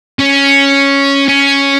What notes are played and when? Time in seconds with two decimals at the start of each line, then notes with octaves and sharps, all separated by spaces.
0.19 C#4
1.29 C#4